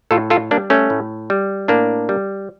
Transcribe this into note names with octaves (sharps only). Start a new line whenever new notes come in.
A2 F4 A4
F4 A4
G3 A#3 D4
A3 C#4
A2
G3
A2 A#3 D4
G3